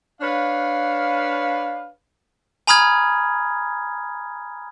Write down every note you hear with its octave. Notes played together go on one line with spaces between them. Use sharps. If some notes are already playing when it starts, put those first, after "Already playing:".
D4 B4 C#5 F5
G#5 A#5 B5 D#6 F6 G#6